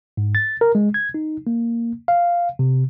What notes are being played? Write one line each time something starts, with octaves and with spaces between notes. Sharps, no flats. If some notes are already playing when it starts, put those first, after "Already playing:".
G#2
A6
A#4
G#3
G#6
D#4
A#3
F5
C3